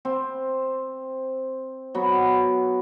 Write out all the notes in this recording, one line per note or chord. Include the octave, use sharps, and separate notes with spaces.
C4
F#3 B3